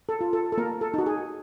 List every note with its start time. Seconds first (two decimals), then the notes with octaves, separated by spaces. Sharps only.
0.09 A4
0.21 F4
0.33 A4
0.52 A4
0.57 A#3 A#4
0.81 A4
0.94 D#4 F#4
1.06 G#4